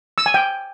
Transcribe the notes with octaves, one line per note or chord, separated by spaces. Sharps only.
E6
G#5
G5